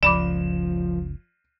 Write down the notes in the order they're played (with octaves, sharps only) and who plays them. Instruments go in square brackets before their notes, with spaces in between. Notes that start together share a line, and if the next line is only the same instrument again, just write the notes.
[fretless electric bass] F#1 C#2 [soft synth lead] F3 [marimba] D5 B5 D6 [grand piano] E7